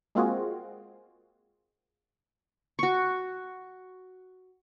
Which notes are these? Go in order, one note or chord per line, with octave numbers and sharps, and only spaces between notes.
G#3 A#3 C4 F4 F#4 G#4
F#4 C#6